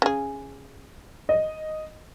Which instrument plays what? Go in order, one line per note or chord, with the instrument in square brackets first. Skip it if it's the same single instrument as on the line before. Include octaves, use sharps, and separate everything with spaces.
[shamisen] C#3 G#4
[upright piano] D#5